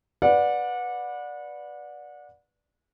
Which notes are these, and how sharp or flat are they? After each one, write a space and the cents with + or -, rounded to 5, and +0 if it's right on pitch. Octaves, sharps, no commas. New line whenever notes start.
B4 -5 D5 +0 F#5 -30